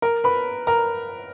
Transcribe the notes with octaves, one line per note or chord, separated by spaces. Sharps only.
A#4 A#5
B4 B5
A#4 A#5